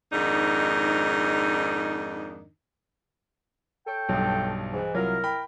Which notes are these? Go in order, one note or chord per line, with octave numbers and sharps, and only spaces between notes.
F2 G#2 D#3 D4 D#4
A4 C#5 G5
B1 G2
G#2 E3
C2 F#3 E4 F4 A#4
G5 B5